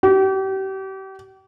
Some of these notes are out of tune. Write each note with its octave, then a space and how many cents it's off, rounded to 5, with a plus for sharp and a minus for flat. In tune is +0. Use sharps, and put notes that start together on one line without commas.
G4 -35